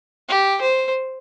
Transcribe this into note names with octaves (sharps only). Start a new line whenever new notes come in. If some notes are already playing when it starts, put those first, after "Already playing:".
G4
C5